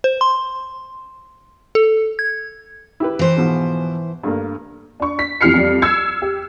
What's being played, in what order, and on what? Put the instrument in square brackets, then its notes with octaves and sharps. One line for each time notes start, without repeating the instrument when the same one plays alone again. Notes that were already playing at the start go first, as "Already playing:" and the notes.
[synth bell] C5
C6
A4
G#6
[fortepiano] E4 G4 B4
[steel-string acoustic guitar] E3 C5
[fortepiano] G#2 B2 F3
G2 A3 A#3
[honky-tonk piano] D4 C#6
B6
F2 E3 G4 F6 C7 C#7
F2 G3
E6 G#6 C#7
G4